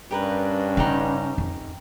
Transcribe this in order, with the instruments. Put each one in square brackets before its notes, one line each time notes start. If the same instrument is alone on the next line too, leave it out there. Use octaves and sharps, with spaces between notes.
[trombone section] G2 [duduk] C#4 [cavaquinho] G4 A#4 B4
[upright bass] C#3 D4 [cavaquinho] D#4 G4 F#5
[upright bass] F2